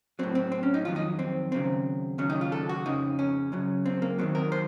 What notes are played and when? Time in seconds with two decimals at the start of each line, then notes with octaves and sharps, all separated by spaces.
0.19 A2 F#3 C4
0.35 C4
0.52 C4
0.63 C#4
0.74 D#4
0.85 F2 D#3 F#3 F4
0.96 D#4
1.19 C4
1.52 D#2 C#3 F#3 C4
2.18 D#2 C#3 F#3 C#4
2.30 D#4
2.41 F4
2.52 A4
2.69 F#4
2.86 F2 C#3 F3 D#4
3.19 C#4
3.52 F#2 C#3 F#3
3.86 C4
4.02 A#3
4.19 D#2 D#3 F#3 C4
4.35 A#4
4.52 C5